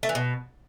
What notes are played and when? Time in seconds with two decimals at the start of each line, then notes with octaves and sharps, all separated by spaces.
0.03 A3
0.09 E3
0.15 B2